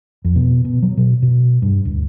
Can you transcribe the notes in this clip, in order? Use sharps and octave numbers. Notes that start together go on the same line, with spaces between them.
F2
B2
B2
F#3
B2
B2
G2
D1